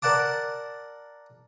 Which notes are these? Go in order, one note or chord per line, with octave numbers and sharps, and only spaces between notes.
A#4 D5 F#5 A5 D6